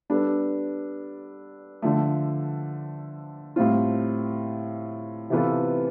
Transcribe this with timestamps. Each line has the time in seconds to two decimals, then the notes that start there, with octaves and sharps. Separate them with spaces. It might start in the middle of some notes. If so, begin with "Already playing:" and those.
0.10 G3 B3 D4 A4
1.82 D3 F3 A3
3.56 A2 G3 C4 F4
5.30 C3 E3 B3 F4 A4